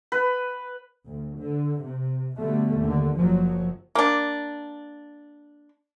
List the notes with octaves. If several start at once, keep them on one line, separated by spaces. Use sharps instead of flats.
B4
D2
D3
C3
B2 D3 G3 A3
D#2 D3
F#1 F3 F#3
A#3 D4